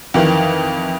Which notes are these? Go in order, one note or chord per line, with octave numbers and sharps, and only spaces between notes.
F2 D#3 E3